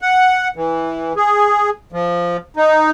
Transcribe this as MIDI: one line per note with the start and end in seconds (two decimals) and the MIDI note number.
0.01 0.48 78
0.56 1.13 52
1.16 1.70 68
1.92 2.37 53
2.57 2.90 63